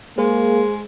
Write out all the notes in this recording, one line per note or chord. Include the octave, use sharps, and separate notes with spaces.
G#3 A#3 G#4 C5